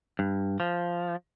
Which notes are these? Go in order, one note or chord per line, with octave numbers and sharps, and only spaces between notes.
G2
F3